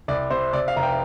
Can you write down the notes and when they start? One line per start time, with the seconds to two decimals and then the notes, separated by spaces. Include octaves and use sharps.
0.08 C2 D5
0.31 C3 C5
0.53 C3 D5
0.68 F5
0.76 F1 A#5
0.83 G5